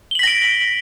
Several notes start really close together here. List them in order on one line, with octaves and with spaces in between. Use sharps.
G7 F#7 B6 A#6 D7